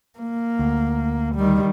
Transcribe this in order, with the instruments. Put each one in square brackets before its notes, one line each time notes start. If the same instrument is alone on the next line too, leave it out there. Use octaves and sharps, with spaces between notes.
[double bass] A#3
[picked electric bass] D2
[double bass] D#3 G3